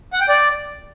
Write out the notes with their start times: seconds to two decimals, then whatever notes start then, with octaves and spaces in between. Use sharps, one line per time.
0.13 F#5
0.21 G5
0.29 D5